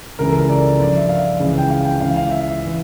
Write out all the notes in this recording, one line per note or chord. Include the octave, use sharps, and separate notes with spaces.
C#2 C#3 E3 A#4
A4
A#4
D5
G2 F3 D5
E5
F5
C#2 C#3 E3
G5
F5
G5
C#2 C#3 E3 F5
F5
E5
E3